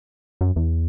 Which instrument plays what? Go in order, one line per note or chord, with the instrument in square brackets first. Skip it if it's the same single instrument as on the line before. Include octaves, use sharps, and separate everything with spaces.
[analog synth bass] F#2
E2